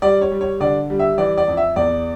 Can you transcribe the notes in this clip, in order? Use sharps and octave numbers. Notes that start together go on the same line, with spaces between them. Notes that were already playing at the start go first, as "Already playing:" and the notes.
G3 D5
C#5
G3
C#5
D3 D5
G3
E5
E3 D5
D5
F2
E5
E2 D5